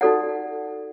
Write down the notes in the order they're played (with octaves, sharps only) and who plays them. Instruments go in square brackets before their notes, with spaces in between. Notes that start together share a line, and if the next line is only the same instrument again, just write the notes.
[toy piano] D#4 F#4 A4 D5 F#5